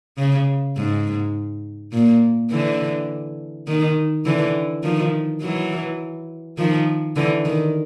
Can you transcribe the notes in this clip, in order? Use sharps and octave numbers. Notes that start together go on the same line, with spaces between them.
C#3
G#2
A#2
D3 E3
D#3
D3 E3
D#3 F3
E3 F#3
D#3 F3
D3 E3
D#3